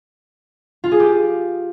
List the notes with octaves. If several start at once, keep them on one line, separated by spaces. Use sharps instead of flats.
F4
G#4
G4